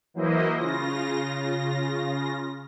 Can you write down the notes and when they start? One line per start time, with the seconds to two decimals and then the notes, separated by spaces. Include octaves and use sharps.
0.14 E3 F#3 A#3 E4 C5 D#5
0.57 C#3 F4 A#6